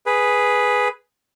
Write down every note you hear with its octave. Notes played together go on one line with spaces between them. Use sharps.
G#4 B4